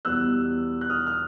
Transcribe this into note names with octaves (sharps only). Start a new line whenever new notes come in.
E2 B2 G3 B3 E6 F#6
F#6
D#6 F6
F6